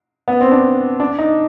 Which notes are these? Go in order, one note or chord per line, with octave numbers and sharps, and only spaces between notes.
B3
C4
D4
D4
D#4